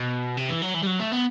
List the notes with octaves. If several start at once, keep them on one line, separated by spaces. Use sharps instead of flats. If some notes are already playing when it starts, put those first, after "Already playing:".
Already playing: B2
C3
E3
F#3
E3
G3
F#3
A3
B3